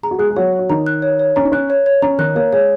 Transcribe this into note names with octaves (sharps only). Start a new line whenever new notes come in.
G#4 A#5
F#4
G#3 G#4 F#6
G#4
F#3 F#4 C#5
C#5
F#4
D#3 D#4 A#5
F#6
C#5
C#5
C#4 A#5
D#4
C#4 F#6
C#5
C#5
C#4 A#5
D#3 D#4 F#6
A#3 A#4 C#5
G#3 G#4 C#5